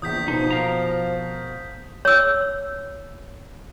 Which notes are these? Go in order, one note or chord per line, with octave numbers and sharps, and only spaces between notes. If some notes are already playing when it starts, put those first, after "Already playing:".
A#1 E2 D#6 G6 B6
B2 F3 D#4 C5
A#4 F5 A#5
C#5 E6